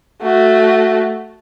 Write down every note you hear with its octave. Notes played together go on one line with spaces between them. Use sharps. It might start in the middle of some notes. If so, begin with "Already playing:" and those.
A3 F#4